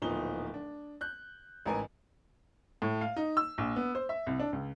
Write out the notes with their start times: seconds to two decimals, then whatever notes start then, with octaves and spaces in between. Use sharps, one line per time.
0.02 D1 A#2 F3 B3 D#4 G7
0.54 D4
1.01 F#6 G6
1.66 A1 G#2 A#4 B4 G#5
2.82 A2
3.01 F5
3.16 D#4
3.37 E6
3.58 A#1
3.76 B3
3.95 C5
4.09 E5
4.27 C2
4.40 D4
4.53 C#2